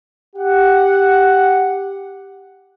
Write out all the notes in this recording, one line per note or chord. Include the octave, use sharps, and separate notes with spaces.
G4 F#5